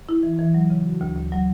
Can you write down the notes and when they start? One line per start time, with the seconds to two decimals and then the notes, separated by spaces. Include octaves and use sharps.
0.09 E4
0.23 E3
0.39 E3
0.54 F#3
0.70 C#3
0.85 F#4
1.01 D2
1.16 D2
1.32 F#3